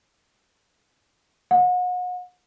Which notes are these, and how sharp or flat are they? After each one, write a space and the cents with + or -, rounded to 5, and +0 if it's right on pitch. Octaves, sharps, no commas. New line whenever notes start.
F#5 -35